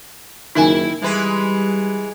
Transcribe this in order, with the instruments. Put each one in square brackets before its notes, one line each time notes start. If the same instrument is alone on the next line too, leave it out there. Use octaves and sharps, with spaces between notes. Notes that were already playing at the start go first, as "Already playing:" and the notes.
[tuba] F#1 [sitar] D#3 E4 [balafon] D#4 A#4 G#5
[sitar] E3 G#3 B4 [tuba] G3